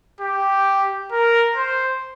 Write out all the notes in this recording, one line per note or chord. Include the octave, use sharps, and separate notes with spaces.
G4
A#4
C5